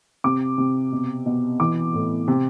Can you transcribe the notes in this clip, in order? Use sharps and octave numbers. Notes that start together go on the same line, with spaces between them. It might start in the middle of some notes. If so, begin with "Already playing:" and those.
C3 D6
C3
B2
B2
E3 D6
A2
C3